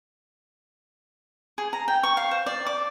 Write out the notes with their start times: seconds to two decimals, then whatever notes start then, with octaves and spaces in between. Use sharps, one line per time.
1.58 G#4
1.73 A#5
1.88 G5
2.03 C#6
2.17 F5
2.31 C5
2.46 D5
2.67 D6